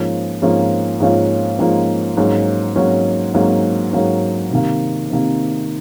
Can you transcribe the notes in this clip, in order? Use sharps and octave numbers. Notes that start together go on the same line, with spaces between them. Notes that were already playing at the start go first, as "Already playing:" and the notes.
Already playing: G#2 F3 A#3 C#4 F4
G#2 F3 A#3 C#4 F4
G#2 F3 A#3 C#4 F4
G#2 F3 A#3 C#4 F4
G#2 F#3 A#3 C#4
G#2 F#3 A#3 C#4
G#2 F#3 A#3 C#4
G#2 F#3 A#3 C#4
C3 D#3 A#3
C3 D#3 A#3